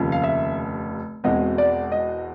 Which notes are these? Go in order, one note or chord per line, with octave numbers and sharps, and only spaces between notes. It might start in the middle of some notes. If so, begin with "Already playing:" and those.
Already playing: F1 D#2 C#3 F3
F5
E5
E1 E2 B2 G#3 C4 D#5
D5
D#5